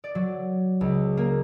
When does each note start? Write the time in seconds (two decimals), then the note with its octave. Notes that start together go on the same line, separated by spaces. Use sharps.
0.04 D5
0.15 F#3
0.81 C#2
1.17 A#3